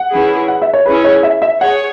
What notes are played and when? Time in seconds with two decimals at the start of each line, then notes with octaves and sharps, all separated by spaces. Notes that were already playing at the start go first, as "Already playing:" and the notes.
Already playing: F#5
0.11 E3 C#4 E4 G#4
0.48 F#5
0.62 E5
0.73 C#5
0.85 E3 C#4 E4 G#4 B4
1.04 C#5
1.23 E5
1.42 E5
1.61 G#4 C#5 F#5